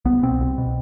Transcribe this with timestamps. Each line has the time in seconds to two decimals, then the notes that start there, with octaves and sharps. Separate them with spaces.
0.05 C2 B3
0.23 B2 C4
0.40 C2
0.58 B2